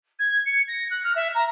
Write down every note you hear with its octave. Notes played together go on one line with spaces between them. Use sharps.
G#6
C#7
A#6
F#6
F6
E5
A#5